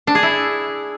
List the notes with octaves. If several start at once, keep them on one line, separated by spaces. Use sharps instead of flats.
D4
G#4
E4